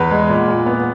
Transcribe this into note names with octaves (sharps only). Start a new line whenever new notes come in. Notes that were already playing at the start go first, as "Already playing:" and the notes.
Already playing: E2 B4
G#3
A#2
A#2
B3